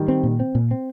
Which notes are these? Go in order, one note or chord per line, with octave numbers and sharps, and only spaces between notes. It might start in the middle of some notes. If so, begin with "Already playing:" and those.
Already playing: D#3 G3
C4
A#2
C4
A#2
C4